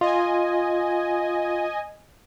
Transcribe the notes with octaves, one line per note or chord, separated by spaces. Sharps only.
F4 D#5 G#5